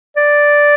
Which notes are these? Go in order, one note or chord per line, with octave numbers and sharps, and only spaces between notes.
D5